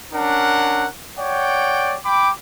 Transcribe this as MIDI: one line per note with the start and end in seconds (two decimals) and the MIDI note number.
0.13 0.87 61
0.13 0.87 62
0.13 0.87 70
0.13 0.87 78
1.19 1.97 73
1.19 1.97 74
1.19 1.97 78
1.19 1.97 79
2.04 2.29 79
2.04 2.29 83
2.04 2.29 86